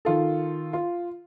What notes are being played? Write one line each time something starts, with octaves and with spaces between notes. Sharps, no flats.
D#3 F4 A4
F4